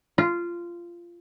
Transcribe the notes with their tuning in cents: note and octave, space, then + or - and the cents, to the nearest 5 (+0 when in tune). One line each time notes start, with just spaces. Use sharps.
F4 -15